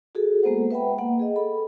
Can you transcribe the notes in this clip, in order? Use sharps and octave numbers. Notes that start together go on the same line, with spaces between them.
F#4 G#4 A4
G#3 A#3 B3 A4 C5 F#5
B4 E5 F#5 G5 B5
A#3 F#5
G#4 D#5
A4 B5